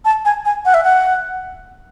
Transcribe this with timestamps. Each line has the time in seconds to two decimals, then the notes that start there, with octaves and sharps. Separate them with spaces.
0.05 A5
0.25 G#5
0.45 G#5
0.65 F#5
0.74 E5
0.84 F#5